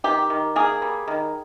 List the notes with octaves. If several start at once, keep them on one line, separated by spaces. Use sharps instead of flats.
D#3 G4
D#3
A#3 G#4
G3
D#3